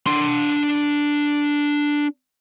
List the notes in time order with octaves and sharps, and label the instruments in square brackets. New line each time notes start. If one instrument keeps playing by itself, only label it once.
[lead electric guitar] D4 C6